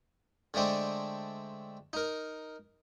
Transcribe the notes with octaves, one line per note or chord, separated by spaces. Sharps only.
D3 G#3 A3 C4 D4
D#4 A#4